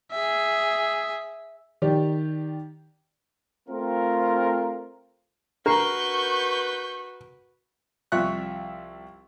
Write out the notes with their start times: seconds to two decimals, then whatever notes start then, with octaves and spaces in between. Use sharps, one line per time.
0.12 G#4 E5
1.82 D#3 G4 D5
3.69 A3 C4 F4 A#4
5.66 D4 F#4 A#4 B4 A#5 C#6 G6 C7
8.12 C2 F3 F4 E5 C#6 F#6